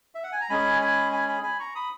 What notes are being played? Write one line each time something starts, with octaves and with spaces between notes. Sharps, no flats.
E5
F#5
G#5
A#5
G#3 C#4 G#4 G#5 B5
G#5 B5
G#5 B5
G#5 B5
G#5 B5
A#5 C#6
B5 D#6